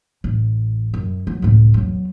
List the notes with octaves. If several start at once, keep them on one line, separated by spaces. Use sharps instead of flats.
A1
F#2
F#3
C#2 A2
E2 F#3